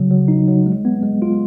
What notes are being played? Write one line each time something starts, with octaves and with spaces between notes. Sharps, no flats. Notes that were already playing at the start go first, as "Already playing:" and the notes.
Already playing: C#3 F#3
F#3
D#4
F#3
G#3
B3
G#3
F4